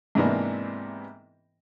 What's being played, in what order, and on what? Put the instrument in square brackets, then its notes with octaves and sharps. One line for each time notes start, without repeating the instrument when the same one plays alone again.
[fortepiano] G#2 C3 E3 A#3 B3 D4